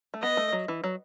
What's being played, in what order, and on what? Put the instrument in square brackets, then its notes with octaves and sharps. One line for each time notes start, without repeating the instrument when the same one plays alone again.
[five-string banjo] A3
[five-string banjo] B3 [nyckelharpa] D#5
[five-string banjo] A3
F#3
E3
F#3